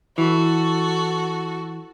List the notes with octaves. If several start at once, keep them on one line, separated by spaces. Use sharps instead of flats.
E3 F#4 A4